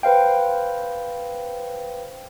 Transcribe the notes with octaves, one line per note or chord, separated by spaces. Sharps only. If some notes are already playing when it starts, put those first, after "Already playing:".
B4 C5 F5 G5